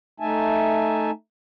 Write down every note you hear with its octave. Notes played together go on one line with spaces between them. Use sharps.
A3 D#4 E5 G#5 A5